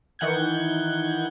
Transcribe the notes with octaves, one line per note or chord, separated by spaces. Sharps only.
D#3 E3 F#5 G6 G#6